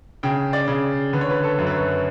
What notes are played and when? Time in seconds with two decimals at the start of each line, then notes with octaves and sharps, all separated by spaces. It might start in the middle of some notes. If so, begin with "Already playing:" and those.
0.23 C#3 G5
0.53 D5
0.68 C#3
1.13 D3 B4
1.21 C#5
1.30 B4
1.43 A4
1.58 F#2
1.66 B4
1.73 C#5